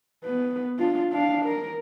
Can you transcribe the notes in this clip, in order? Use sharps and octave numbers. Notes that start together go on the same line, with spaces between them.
B3 B4
D4 F4
D4 F5
A#4